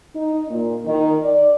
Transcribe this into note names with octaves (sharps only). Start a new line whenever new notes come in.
D#4
A#2
D#3
D5